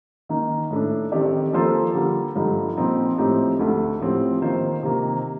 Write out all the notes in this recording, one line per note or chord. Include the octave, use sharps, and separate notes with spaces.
D#3 A#3 D#4
A2 A3 D4
D#3 A3 C4 G4 D5
F3 A#3 F4 A4 C5
D3 G3 A#3
G2 D3 F3 A3 D#4
A#2 F3 C4 D#4
A2 F3 C4 D#4 G4
D2 D3 A3
A2 F3 C4 G4
D#3 A#3 F4 C5
C3 D#3 A#3